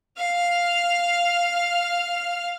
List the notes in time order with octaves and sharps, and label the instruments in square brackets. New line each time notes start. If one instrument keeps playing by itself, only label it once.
[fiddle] F5 F6